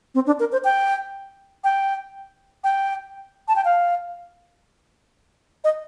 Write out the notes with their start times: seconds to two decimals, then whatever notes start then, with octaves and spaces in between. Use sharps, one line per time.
0.15 C4
0.27 D4
0.40 A#4
0.52 C5
0.64 G5
1.64 G5
2.64 G5
3.48 A5
3.56 G5
3.65 F5
5.64 D#5